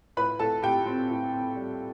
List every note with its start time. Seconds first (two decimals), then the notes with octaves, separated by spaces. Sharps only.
0.17 A2 B4 B5
0.39 A2 A4 A5
0.62 A2 G4 G5
0.86 C4
1.10 A2
1.32 C4
1.56 G3